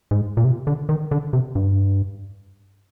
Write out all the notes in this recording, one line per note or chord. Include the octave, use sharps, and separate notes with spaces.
G#2
A#2
C3
D3
D#3
D3
C3
G2